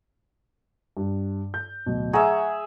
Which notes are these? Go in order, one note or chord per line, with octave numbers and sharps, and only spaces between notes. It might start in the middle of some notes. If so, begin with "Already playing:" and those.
G2
G6
D1 B2
G#4 E5 F#5 A#5 C#6